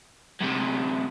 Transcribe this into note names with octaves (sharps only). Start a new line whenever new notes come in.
F#2 C3